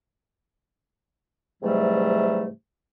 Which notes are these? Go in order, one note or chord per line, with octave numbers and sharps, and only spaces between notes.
G#2 C3 E3 F#3 G3 A3